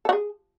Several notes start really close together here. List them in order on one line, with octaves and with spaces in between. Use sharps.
A4 F#4 G#4